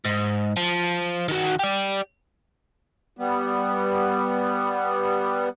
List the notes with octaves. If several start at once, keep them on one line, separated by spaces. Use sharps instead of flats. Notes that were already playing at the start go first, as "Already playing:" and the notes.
G#2
F3
D#3 F#4
G4 D5
G3 B3